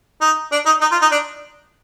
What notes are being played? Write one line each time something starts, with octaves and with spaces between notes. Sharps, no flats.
D#4
D4
D#4
D#4
F4
D#4
D4